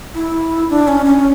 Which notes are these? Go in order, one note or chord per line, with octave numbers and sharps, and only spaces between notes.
E4
D4
C#4
C#4